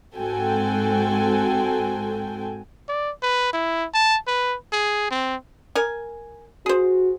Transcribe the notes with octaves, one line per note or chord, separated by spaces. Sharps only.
G#2 C4 F#4 A4 G5 G#5
D5
B4
E4
A5
B4
G#4
C4
A#4 G#5
F#4 G#4 C5